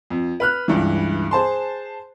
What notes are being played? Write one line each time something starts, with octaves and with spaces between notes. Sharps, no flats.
F2
B4 F6 F#6
C#2 G2 E3
G#4 C5 A5 C6